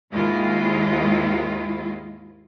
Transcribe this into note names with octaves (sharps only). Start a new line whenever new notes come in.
D#2 G#2 D#3 G#3 E4 F4